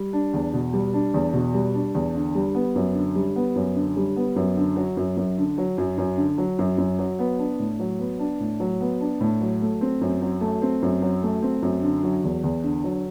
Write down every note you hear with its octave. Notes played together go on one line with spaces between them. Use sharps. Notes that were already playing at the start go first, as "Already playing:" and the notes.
Already playing: G3
D4
E2
B2
G3
D4
E2
B2
G3
D4
E2
D3
G3
B3
F#2
D3
G3
B3
F#2
D3
G3
B3
F#2
D3
F#3
F#2
F#2
D3
F#3
F#2
F#2
D3
F#3
F#2
F#2
F#3
B3
D4
A2
F#3
B3
D4
A2
F#3
B3
D4
A2
F#3
A3
C4
F#2
F#3
A3
C4
F#2
F#3
A3
C4
F#2
D3
F#3
E2
E2
D3
F#3